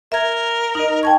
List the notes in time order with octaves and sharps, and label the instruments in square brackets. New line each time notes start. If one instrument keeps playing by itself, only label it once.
[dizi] A#4 [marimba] E5 G#6
[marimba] D#4 D#5
[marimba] G5 A5 C#6 [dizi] G#6